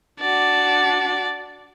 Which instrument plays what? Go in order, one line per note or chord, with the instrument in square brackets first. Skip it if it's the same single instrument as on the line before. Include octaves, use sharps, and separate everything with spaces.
[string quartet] D4 F#4 [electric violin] D5